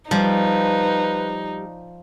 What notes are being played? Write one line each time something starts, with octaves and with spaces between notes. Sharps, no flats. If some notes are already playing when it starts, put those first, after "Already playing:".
F3 G3 D#4 B4